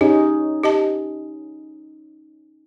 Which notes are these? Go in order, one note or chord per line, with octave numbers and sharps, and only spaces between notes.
C#4 D#4 G4 G#4
G4 D#5 A5